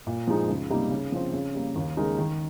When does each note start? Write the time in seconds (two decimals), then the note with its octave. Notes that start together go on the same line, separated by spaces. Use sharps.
0.07 A#2
0.27 F3 G#3 D#4
0.49 C#2
0.70 C3 G3 A#3 D#4
0.91 C#3
1.12 F3 C4
1.33 C#3
1.54 G3 A#3
1.76 D#2
1.97 C#3 G#3 D#4 A#4
2.18 D#3